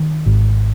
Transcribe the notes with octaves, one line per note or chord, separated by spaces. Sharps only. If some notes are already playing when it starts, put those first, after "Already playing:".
Already playing: D#3
G#1